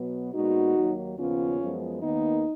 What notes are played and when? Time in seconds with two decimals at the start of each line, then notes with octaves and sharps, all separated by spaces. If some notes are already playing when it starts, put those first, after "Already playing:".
Already playing: B2 F#3 B3
0.33 A#2 G#3 B3 D#4 F#4
0.75 D#2 D#3 F#3 A#3
1.17 D#2 C#3 F3 B3 C#4 F4
1.60 F#2 F3 G#3 B3
2.02 D#2 D#3 A#3 B3 D#4